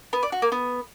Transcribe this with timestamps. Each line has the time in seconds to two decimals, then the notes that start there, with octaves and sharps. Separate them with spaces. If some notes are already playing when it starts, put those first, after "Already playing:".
0.13 B3
0.23 D5
0.32 F#4
0.42 A#3
0.52 B3